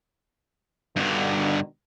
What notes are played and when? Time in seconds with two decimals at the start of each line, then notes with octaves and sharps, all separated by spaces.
0.96 G2 B2 D3 D#3 D4